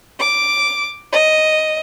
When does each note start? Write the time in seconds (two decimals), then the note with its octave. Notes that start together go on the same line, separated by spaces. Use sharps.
0.20 D6
1.13 D#5